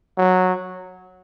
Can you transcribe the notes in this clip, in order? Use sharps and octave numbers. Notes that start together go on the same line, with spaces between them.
F#3